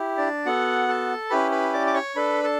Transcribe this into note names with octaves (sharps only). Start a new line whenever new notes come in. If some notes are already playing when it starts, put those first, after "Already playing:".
Already playing: E4 G4
D4 D5
B3 F#4 A4 F#5
A4 A5
C#4 E4 G4 B4 B5
B4 B5
D5 D6
D6
C#5 C#6
D4 A4 B4 B5
A4 A5